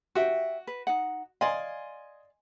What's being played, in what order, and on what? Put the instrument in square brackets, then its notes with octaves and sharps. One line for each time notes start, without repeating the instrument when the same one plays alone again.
[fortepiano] F#4 [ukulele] G4 E5 G5
[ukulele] B4
D#4 F#5
[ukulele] D5 F5 [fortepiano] D#5 G#5 C6